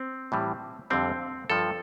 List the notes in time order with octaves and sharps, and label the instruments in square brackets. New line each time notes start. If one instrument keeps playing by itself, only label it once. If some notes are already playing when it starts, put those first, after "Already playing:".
Already playing: [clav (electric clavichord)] C4
A2 E3 G3
F2 D3 G3 C4
G2 F3 A4